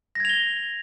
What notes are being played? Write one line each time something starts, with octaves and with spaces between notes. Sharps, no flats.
G#6 A#6 F7 G7